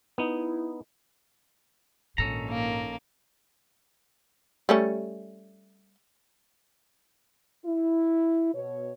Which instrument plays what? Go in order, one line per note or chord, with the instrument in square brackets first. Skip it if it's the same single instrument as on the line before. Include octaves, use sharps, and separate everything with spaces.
[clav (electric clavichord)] B3 D#4 [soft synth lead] E4
[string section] A#1 D#3 [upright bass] G#2 [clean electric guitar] C#4 A4 A#5
[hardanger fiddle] A#3
[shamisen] G3 A3 C#4
[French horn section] E4
B2 C#5